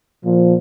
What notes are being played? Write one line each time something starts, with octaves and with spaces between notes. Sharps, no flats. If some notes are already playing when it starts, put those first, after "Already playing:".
A#2 F3